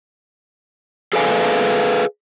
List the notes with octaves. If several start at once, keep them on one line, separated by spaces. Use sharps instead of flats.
G#4 A4 B4 D5 F5 G#5